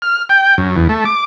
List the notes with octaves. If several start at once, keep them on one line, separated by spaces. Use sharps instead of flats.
F6
G5
F#2
E2
A3
D6